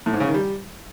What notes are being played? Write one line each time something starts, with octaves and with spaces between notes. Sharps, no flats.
A2
G#2
C#3
D#3
G3